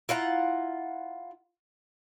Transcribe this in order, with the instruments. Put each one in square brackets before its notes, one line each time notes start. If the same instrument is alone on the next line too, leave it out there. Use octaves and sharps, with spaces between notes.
[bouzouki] E4 F4 F#5 A#5